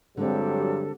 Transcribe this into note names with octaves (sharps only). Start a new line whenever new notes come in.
G2 D3 F#3 G#3 C4 G4 A4